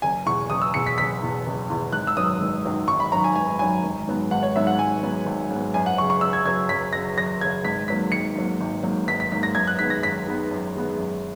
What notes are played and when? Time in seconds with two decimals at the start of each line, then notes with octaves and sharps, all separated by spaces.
0.02 F#1 G#5
0.26 E2 B2 C#6
0.50 F#1 D#6
0.62 E6
0.74 E2 B2 C#7
0.87 B6
0.98 F#1 B6
1.22 E2 B2
1.46 F#1
1.70 E2 B2
1.93 G#1 F#6
2.07 E6
2.16 F#2 D#3 F#3 D#6
2.41 G#1
2.65 F#2 D#3 F#3
2.88 G#1 C#6
3.00 B5
3.12 F#2 D#3 F#3 A#5
3.24 G#5
3.35 G#1 G#5
3.59 F#2 D#3 F#3 G#5
3.84 G#1
4.08 G#2 F#3 B3
4.31 G#1 F#5
4.43 C#5
4.55 G#2 F#3 B3 E5
4.67 F#5
4.79 G#1 G#5
5.03 G#2 F#3 B3
5.26 G#1
5.51 G#2 F#3 B3
5.74 F#2 G#5
5.86 F#5
5.97 F#3 C#6
6.01 C#3
6.10 C#6
6.21 F#2 E6
6.33 G#6
6.45 C#3 F#3 G#6
6.69 F#2 B6
6.93 C#3 F#3 A#6
7.17 F#2 A#6
7.41 C#3 G#6
7.45 F#3
7.65 G#1 B6
7.88 G#2 F#3 A#3 B6
8.12 G#1 C#7
8.36 G#2 F#3 A#3
8.61 G#1
8.83 G#2 F#3 A#3
9.07 G#1 B6
9.20 B6
9.32 G#2 F#3 A#3 B6
9.43 A#6
9.55 F#2 G#6
9.67 F#6
9.79 D#3 G#3 B3 B6
9.90 A#6
10.02 F#2 B6
10.27 D#3 G#3 B3
10.51 F#2
10.74 D#3 G#3 B3
10.98 F#2